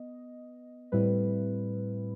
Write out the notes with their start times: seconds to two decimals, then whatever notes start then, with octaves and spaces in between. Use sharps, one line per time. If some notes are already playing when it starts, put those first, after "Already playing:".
Already playing: B3 D#5
0.92 A2 G3 C4 E4 B4